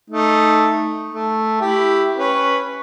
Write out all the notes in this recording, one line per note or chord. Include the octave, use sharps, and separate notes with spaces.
A3 D#4
A3
E4 G4
C#4 B4